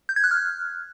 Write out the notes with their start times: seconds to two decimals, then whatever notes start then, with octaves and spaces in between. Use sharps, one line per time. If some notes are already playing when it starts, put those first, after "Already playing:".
0.09 G6
0.16 G#6
0.24 F#6
0.31 F6